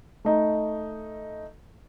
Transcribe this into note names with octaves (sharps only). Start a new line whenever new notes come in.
A3 D#4